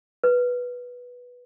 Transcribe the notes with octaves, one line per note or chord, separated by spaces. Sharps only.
B4